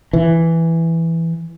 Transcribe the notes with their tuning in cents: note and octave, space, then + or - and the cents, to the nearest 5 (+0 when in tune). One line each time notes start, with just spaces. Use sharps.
E3 +5